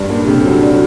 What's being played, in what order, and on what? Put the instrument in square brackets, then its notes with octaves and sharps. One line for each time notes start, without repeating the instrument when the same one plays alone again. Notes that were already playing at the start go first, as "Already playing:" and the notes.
Already playing: [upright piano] G2 [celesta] D5
[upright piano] A#2 [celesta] D4
[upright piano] C3 [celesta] A4
[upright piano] F#3 [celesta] D4
[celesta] D5
[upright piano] F#3